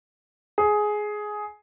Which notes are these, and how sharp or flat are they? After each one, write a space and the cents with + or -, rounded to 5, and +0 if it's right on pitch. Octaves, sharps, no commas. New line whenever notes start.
G#4 +10